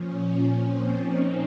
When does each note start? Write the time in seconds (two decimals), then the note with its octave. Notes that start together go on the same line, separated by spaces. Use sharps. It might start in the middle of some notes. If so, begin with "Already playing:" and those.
Already playing: A#2 F3 C#4
0.56 C4
0.96 D#4